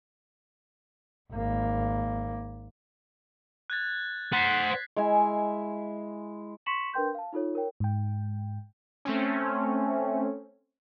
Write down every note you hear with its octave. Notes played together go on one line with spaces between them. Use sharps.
G#1 A#3
F#6 G#6 A6
C5 F#5 A6 B6 C7
G#3 E4 E5 G#5
C6 C#6 B6 C#7 E7 F#7
D4 A#4 B4 G5 C6 G6
F5 A5
D#4 F4 A4 C#5
A#4 C#5 G5
G#2 G5
A3 C4 C#4